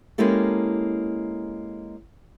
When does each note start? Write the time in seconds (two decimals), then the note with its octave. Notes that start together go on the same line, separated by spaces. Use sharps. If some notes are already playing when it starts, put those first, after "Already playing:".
0.18 G#3 A#3 C#4 E4 G4 A4